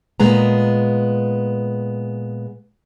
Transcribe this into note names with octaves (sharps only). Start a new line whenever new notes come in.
A#2 G#3 B3 A#5